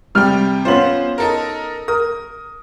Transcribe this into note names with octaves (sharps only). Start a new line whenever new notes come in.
C3 G3 G5 F6
B3 C#4 F4 C5 F#7
D#4 A4 A#4
A#4 D#6